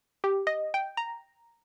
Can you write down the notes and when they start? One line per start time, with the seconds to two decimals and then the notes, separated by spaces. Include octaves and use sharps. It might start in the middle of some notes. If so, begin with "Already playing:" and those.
0.24 G4
0.47 D#5
0.74 G5
0.97 A#5